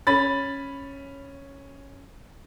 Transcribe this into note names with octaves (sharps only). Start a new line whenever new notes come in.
C#4 B5 A6